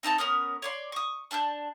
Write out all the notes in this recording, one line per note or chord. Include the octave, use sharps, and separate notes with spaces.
C4 D#4 A4 A5
B3 C#4 A#4 D#6
C#5 D5 C6
C#6 D#6
D4 A5 E6 G6